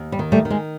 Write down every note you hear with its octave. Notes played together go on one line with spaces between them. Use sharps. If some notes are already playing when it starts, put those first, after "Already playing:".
Already playing: D#2
G3
D#3
G3 A3
D#3
G#3